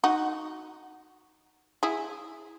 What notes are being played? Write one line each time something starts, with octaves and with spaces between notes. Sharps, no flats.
D#4 F#4
E4 G#4